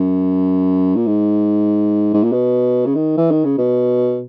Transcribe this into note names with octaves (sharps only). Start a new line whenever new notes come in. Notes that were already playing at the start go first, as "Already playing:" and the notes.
Already playing: F#2
A#2
G#2
G#2
A#2
B2
C#3
D#3
E3
D#3
C#3
B2